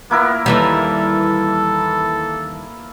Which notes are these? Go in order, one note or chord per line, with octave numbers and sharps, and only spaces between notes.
A#3 B3 E4 A#4
D#2 E3 G3 A4